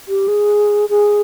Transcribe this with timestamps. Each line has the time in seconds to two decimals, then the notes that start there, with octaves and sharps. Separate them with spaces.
0.08 G4
0.28 G#4
0.89 G#4